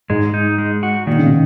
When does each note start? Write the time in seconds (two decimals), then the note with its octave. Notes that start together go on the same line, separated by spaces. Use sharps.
0.10 G#2 G#3
0.34 D#4
0.58 G#3
0.83 F#4
1.06 A#2 D#3
1.18 C#3
1.24 B2